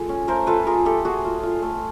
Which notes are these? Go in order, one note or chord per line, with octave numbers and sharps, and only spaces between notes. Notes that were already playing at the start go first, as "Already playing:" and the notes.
Already playing: G#3 F4 A4
C#4
A3 A#4 C5
F4 A4 B4
F4 G#4 A#4
A3 G4 A4
A3 F#4 G#4
F4
F4
A3